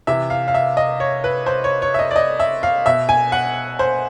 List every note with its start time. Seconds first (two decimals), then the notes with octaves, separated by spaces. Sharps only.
0.07 C3 E3 E5
0.30 F5
0.48 F5
0.54 E5
0.77 D#5
1.00 C#5
1.24 B4
1.46 C5
1.64 C#5
1.82 C#5
1.94 E5
1.99 D#5
2.11 D5
2.16 D#5
2.40 E5
2.63 F5
2.86 B2 E5
3.09 G#5
3.32 F#5
3.79 C5